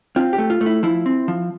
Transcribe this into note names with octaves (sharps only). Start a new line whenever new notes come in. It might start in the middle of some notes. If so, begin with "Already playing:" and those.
C4 F4
G4
A3
F4
A3
E4
F3 E4
C4
F3